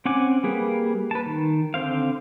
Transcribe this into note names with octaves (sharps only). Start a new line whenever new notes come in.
C4 C#4 F#5 G#5 D6
G3 A#3 G#4 B4
B4 A5
D#3
D3 C4 C5 F5